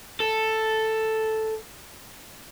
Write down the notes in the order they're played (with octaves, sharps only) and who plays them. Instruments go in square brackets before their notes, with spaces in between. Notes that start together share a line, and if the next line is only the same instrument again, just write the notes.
[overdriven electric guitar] A4